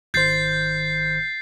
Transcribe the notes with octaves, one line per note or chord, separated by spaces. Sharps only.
G#1 D#3 C5 G6 A6 C7